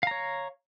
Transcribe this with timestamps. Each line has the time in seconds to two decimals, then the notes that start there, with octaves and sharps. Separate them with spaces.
0.03 F5
0.07 A#5
0.11 C#5